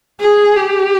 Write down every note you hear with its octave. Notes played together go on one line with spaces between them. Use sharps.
G#4
G4